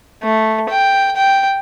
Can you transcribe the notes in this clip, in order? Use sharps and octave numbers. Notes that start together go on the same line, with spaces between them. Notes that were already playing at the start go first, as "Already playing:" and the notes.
A3
G5
G5